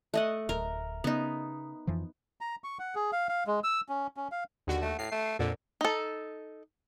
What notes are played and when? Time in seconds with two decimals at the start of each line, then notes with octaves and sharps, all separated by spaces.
0.14 A3 D#5 F#5
0.49 D1 A#4
1.04 C#3 B3 D#4
1.87 F2 E3 F3
2.41 A#5
2.64 C#6
2.79 F#5
2.95 G#4
3.12 F5
3.29 F5
3.47 G#3
3.64 E6
3.89 C#4
4.17 C#4
4.32 F5
4.67 D#2 D3 F#4
4.82 A3
4.99 A2 C7
5.12 A3
5.39 F2 A#2 D3
5.81 D#4 A4